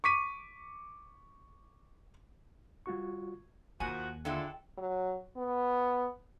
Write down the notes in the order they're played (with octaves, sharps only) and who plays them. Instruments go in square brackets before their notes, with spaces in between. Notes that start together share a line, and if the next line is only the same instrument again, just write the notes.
[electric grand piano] C#6 D6 B6 D#7
[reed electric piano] G3 F4 F#4 C#6
[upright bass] D#2 [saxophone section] D#3 F3 F#4 [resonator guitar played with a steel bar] G#5
[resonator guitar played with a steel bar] D3 E4 F4 [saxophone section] F#3 G#3 A4 [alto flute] G5
[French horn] F#3
B3